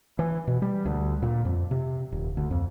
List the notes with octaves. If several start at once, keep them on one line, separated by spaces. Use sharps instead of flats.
E3
B2
G3
D2
A#2
F2
C3
D#1
D2
F2